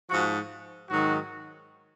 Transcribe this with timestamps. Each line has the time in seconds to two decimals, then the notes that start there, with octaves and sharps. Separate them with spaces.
0.09 G#2 F3 F#4
0.90 G#2 D#3 F#3 F#4